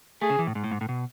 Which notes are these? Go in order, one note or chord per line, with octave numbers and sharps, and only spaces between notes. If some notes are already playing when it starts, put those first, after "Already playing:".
A3 G#4
C#3
E3
A2
G#2
A2
G#2
A2
B2